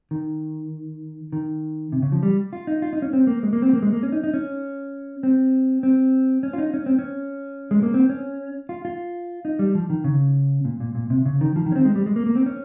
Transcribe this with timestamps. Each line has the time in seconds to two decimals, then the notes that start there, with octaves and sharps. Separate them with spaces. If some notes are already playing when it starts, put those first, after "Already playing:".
0.11 D#3
1.33 D#3
1.92 C3
2.02 C#3
2.12 F3
2.23 G3
2.53 F4
2.67 D#4
2.82 F4
2.93 D#4
3.02 C#4
3.13 C4
3.27 A#3
3.43 G#3
3.53 A#3
3.62 C4
3.73 A#3
3.82 G#3
3.93 A#3
4.03 C#4
4.12 D#4
4.24 D#4
4.34 C#4
5.23 C4
5.83 C4
6.43 C#4
6.53 F4
6.58 D#4
6.74 C#4
6.86 C4
6.99 C#4
7.71 G#3
7.83 A#3
7.94 C4
8.09 C#4
8.69 F4
8.85 F4
9.45 D#4
9.59 G3
9.75 F3
9.90 D#3
10.04 C#3
10.65 A#2
10.80 A#2
10.95 A#2
11.10 C3
11.26 C#3
11.41 D#3
11.56 F3
11.66 D#3
11.72 C#4
11.76 C4
11.85 G#3
11.95 G3
12.06 G#3
12.16 A#3
12.26 A#3
12.35 C4
12.46 C#4